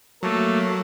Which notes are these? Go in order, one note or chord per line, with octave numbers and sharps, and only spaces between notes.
F#3 A3 A#3